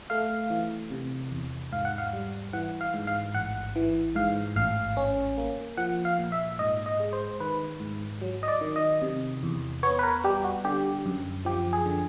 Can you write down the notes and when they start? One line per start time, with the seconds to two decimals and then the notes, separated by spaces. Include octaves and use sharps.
0.10 A3 F5
0.50 E3
0.91 C3
1.31 E2
1.72 G#2 F5
1.85 F#5
1.98 F5
2.13 G3
2.53 E3 F#5
2.81 F5
2.94 G#2
3.07 F5
3.34 A1 F#5
3.76 E3
4.15 G#2 F5
4.56 A1 F5
4.97 C#4
5.38 A#3
5.77 F3 F#5
6.05 F5
6.19 A#2
6.32 E5
6.59 G#2 D#5
6.86 D#5
7.00 G#3
7.13 C5
7.40 D#3 B4
7.80 G#2
8.21 F#3
8.43 D#5
8.48 D5
8.61 D#3
8.76 D#5
9.02 C3
9.43 E2
9.83 B3 C#5
9.99 B4
10.03 A#4
10.24 G3 G4
10.44 F#4
10.65 D3 G4
11.06 F#2
11.45 F3 G4
11.73 G#4
11.86 D3